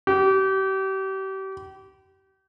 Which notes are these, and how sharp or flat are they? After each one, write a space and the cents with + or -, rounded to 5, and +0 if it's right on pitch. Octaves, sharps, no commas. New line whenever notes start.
G4 -35